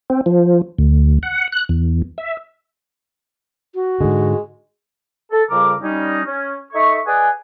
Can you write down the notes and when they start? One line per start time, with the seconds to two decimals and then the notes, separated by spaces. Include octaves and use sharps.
0.10 C4
0.26 F3
0.78 D2
1.23 F#5
1.52 F#6
1.69 E2
2.18 E5
3.75 F#4
4.01 G#2 D3 G#3
5.31 A4
5.50 F2 C#3 G3 A#4 D6
5.83 G3 C#4 D#4
6.26 C#4
6.73 D#4 A4 E5 C#6
7.06 G#4 B4 D5 D#5 F#5 G#5